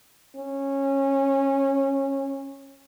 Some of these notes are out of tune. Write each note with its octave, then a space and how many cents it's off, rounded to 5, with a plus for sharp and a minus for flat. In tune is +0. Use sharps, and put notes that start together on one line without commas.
C#4 -20